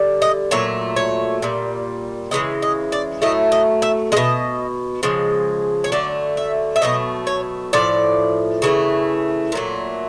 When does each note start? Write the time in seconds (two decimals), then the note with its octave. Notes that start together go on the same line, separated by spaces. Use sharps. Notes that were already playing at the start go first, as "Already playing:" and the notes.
Already playing: D3 G3
0.22 D#5
0.51 A#2 F#3 A3 C#5
0.96 C#5
1.42 A#2 G3
2.31 C#3 E3 G#3 D#5
2.62 D#5
2.92 D5
3.22 A2 F#3 A3 D#5
3.52 D#5
3.82 E5
4.12 B2 G#3 D#5
5.03 C#3 F3 G#3
5.84 C#5
5.92 D3 F#3 A3 D5
6.37 E5
6.76 E5
6.82 B2 F#3 A3 D#5
7.27 C#5
7.73 A2 F3 D5
8.62 C#3 E3 A3
9.52 A#2 F#3 A3